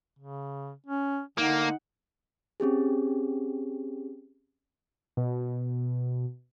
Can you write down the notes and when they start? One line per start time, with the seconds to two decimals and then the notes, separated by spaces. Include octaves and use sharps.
0.19 C#3
0.86 C#4
1.38 D3 A#3 D#4 F#5
2.60 C4 C#4 G4 G#4
5.17 B2